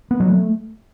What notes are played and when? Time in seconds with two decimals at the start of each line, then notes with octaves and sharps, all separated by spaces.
0.11 B3
0.20 F#3
0.29 A3